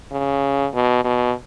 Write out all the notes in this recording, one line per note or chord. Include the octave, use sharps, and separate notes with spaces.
C#3
B2
B2